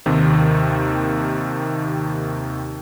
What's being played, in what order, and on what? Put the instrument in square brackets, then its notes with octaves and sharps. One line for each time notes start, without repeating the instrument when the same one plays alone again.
[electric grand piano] D#2 C3 D#3